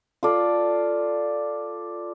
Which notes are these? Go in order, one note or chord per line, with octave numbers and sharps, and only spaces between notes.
F4 A4 D5